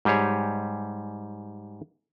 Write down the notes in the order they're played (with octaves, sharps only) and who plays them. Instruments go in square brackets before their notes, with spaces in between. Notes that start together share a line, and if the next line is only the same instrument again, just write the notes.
[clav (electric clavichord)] G#2 G3 G4 G#4 C#5